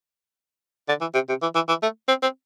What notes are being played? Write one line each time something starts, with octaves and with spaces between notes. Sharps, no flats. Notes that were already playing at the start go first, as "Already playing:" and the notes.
D3
E3
C3
C3
E3
E3
E3
A3
C4
C4